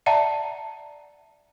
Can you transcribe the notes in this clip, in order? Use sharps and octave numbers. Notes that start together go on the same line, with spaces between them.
D5 E5 F#5 A5 A#5